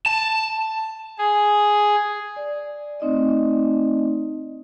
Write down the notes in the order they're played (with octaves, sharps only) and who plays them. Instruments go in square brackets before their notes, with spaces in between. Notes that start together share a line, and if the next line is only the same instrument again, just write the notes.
[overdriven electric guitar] A5
[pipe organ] G#4
[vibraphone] D5
A3 C4 D#4 D5 D#5